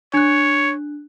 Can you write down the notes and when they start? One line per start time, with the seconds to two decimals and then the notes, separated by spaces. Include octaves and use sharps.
0.14 D4 C#5 F#6